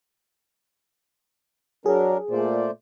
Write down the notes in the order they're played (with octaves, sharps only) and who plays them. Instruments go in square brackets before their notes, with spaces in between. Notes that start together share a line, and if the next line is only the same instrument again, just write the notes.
[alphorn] F#3 [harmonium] D4 A#4 [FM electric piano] G#4
[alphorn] A#2 [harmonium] A3 C5 D5